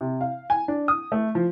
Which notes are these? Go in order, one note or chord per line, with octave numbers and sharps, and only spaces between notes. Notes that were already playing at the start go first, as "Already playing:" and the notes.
C3
F5
G#5
D4
D#6
A3
F3